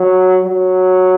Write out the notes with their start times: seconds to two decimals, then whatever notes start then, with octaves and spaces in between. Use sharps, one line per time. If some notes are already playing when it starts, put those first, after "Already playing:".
Already playing: F#3
0.44 F#3